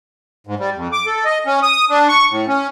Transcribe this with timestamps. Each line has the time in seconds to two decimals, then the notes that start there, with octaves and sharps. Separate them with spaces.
0.47 G#2
0.59 G3
0.75 F2
0.93 D6
1.06 A4
1.25 D#5
1.47 C#4
1.63 D#6
1.90 D4
2.09 C#6
2.30 A2
2.48 C#4